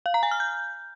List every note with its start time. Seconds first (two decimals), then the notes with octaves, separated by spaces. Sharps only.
0.06 F5
0.14 A#5
0.23 G#5
0.31 F6
0.40 G6